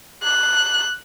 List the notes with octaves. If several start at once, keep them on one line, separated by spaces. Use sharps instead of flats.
F#6